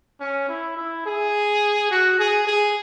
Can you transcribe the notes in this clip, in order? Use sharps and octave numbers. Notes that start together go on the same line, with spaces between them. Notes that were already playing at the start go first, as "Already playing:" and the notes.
C#4
E4
E4
G#4
F#4
G#4
G#4